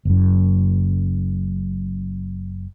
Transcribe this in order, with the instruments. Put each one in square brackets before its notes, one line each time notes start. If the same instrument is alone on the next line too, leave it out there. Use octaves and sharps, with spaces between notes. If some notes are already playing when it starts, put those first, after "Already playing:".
[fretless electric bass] F#1 F#2